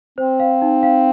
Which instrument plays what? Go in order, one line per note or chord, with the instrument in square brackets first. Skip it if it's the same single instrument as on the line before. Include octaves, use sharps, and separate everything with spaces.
[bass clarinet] C4 [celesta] C5
[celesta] F5
D#4
F5